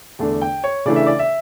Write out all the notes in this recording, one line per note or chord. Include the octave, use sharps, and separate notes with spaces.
E2 D3 A3 D4
G5
C#5
C#3 E3 A3 D4 D5
E5
D5
E5